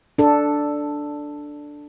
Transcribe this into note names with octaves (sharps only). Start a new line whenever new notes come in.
D4 A4